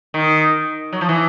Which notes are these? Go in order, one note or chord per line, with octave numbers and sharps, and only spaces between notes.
D#3
F#3
F3
E3